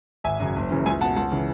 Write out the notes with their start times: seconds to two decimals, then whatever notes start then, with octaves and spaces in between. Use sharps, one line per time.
0.24 G#1 E5 G#5
0.40 F#2 C#3
0.56 F#1
0.71 F#2 C#3 E3
0.86 C#2 E5 G#5
1.01 B2 F#5 A5
1.16 C#2 F#5 A5
1.32 C#3 E3